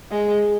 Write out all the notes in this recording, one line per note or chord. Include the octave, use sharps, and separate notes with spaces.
G#3